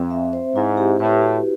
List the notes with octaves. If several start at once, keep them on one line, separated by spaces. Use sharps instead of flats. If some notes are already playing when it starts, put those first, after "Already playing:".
Already playing: F2 C4
E5
C5
G#2 E4
G4
A2 B4
F#4